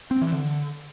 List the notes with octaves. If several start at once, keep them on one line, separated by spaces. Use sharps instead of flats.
C4
E3
D3